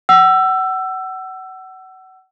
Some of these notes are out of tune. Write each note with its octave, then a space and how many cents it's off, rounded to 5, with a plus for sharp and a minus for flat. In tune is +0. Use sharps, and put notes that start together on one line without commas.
F#5 +30 E6 +20